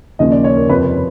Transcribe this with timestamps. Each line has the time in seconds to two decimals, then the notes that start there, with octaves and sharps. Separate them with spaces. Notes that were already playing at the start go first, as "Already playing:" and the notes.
0.19 D#2 C#3 F3 A#3 C#4 D#5
0.32 D5
0.44 C#5
0.56 A#4
0.69 F2 C3 F3 B4